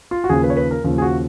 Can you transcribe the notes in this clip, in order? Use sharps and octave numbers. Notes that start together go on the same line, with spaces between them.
F4
F#4
D#2 C#3 F3 G#4
B4
C#5
B4
A#4
D#2 C#3 F3
G#4
F#4